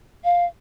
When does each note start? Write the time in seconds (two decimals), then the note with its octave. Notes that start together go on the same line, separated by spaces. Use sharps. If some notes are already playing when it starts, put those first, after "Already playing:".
0.24 F5